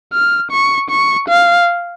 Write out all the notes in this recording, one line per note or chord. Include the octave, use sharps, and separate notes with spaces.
F6
C#6
C#6
F5